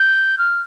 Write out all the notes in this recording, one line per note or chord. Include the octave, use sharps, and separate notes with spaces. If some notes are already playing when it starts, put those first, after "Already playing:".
Already playing: G6
F6